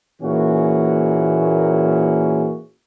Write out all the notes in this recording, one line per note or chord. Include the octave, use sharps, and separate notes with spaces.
A#2 E3 A#3 C#4 F#4 G#4